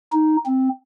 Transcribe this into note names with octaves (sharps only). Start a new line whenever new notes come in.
D#4
C4